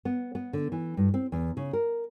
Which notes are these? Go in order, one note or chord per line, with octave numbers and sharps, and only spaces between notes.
B3
B3
D3
E3
G2
C4
E2
C#3
A#4